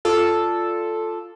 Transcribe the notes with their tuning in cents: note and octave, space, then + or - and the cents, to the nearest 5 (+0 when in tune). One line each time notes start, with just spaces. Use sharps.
F4 +0 A4 +0 D5 +0